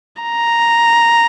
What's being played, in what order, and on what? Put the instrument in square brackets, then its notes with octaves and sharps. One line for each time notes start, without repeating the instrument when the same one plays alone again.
[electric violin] A#5